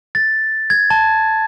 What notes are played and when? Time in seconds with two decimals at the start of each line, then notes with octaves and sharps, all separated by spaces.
0.15 A6
0.70 G#6
0.90 A5